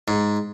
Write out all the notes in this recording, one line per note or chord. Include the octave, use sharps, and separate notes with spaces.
G#2